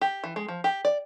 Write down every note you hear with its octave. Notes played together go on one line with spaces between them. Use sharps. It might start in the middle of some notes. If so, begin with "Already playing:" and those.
G4
E3
G#3
F3
G4
D5